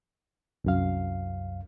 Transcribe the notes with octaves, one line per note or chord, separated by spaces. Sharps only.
C2 F#2 F5